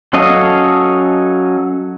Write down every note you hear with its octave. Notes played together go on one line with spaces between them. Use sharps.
F#3 C#4 A4 D#5 F5